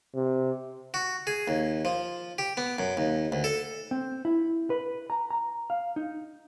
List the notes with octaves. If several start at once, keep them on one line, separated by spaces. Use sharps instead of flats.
C3
F#4
G#4
D#2
F3
G4
B3
F#2
D#2
D2
A4
C4
E4
B4
A#5
A#5
F5
D#4